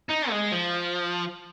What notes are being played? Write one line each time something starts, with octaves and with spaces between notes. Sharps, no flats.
D#4
G#3
F3